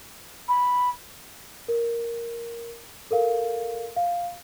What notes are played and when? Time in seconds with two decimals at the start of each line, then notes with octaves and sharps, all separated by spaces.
0.48 B5
1.68 A#4
3.11 A4 A#4 F5
3.96 F5